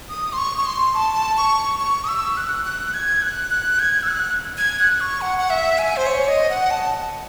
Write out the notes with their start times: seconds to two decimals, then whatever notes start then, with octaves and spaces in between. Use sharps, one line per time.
0.09 D#6
0.33 C6
0.38 C#6
0.58 C#6
0.66 C6
0.94 A5
1.37 C#6
1.80 C#6
2.04 D#6
2.08 E6
2.37 F#6
2.65 F#6
2.94 G#6
3.22 F#6
3.51 F#6
3.79 G#6
4.03 E6
4.08 F#6
4.57 G#6
4.79 F#6
5.00 C#6
5.21 F#5
5.39 F#5
5.50 E5
5.78 G#5
5.96 C5
6.07 C#5
6.28 D#5
6.50 F#5
6.71 A5